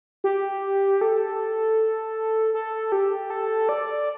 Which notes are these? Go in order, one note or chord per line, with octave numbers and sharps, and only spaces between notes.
G4
A4
A4
G4
A4
D5